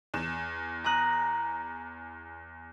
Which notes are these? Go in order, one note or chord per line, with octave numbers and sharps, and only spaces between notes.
E2 E7
A#5 D#6 F#6